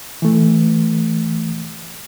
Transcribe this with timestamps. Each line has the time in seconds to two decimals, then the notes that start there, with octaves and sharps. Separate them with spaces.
0.22 E3 A3